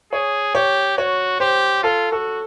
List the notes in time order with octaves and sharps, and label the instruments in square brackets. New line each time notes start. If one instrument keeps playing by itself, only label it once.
[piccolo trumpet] G#4 [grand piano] C#5
[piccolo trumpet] G4 [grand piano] C#5
[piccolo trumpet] F#4 [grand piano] C#5
[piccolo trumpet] G4 [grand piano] C5
[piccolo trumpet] F4 [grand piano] A4
[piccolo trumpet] F#4 [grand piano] A4